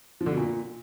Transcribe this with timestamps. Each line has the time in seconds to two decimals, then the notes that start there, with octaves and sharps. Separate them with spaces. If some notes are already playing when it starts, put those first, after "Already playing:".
0.21 F3
0.26 D3
0.32 B2
0.37 A#2